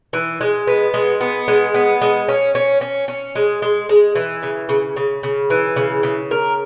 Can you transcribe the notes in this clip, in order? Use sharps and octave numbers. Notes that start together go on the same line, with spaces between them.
E3
G#3
B3
G#3
B3
G#3
B3
G#3
C#4
C#4
C#4
C#4
G#3
G#3
G#3
E3
C#3
C#3
C#3
C#3
E3
C#3
C#3
A#4